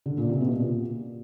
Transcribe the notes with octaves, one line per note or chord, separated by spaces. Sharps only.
D3
A#2
C3
B2
A#2